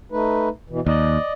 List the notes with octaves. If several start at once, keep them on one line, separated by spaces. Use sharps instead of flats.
A3 D#4 B4
B2 E3
D#2 D5 D#5